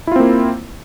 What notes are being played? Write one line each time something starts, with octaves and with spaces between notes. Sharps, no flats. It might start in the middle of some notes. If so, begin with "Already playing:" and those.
A#3 C4 E4 F4